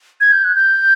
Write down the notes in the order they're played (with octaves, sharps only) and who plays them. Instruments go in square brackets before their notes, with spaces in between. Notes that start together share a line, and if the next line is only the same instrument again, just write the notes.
[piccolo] G#6
G6
F#6
G6